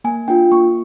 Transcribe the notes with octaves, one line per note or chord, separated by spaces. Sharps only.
A#3 G#5
D4 F4 G5
A#3 C#6